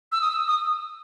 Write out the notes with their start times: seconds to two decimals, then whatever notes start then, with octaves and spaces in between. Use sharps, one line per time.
0.12 E6
0.21 D#6
0.31 E6
0.48 D#6